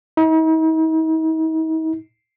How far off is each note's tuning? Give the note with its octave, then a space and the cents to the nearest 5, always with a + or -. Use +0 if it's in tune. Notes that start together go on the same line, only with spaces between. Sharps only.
D#4 +45